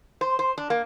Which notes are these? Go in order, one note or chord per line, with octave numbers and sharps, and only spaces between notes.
C5
C5
D4
A#3